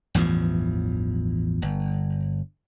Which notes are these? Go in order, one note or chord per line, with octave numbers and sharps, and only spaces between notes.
A1 E2 G2 F3
G1